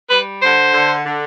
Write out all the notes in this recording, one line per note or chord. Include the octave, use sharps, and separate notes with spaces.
G3 B4
D3 C5
D3
D3